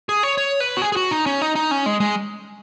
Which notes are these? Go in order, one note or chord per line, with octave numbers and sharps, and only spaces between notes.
G#4
C#5
C#5
B4
F#4
G#4
G#4
F#4
D#4
C#4
D#4
D#4
C#4
G#3
G#3